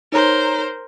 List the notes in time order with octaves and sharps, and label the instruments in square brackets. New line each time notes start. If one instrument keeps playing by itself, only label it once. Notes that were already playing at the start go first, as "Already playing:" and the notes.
[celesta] D#4 C#5 A#5 [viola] A#4 C5